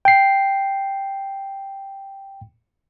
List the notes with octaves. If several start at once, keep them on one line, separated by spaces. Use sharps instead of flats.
G5 C7